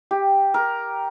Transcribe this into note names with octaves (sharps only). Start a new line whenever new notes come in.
G4
A#4